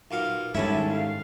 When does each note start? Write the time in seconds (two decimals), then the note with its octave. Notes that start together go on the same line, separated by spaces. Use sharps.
0.11 B1 A#2 F5
0.55 C2 G#2 D#3 G3 C#4 E4 A4 E5
0.91 F5